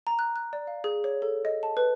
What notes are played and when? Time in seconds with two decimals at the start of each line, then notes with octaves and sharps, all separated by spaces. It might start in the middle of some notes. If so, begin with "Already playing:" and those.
0.07 A#5
0.19 F#6
0.36 F#6
0.53 D5
0.67 F5
0.84 G#4
1.04 C#5
1.22 A4
1.45 D#5
1.63 A5
1.77 B4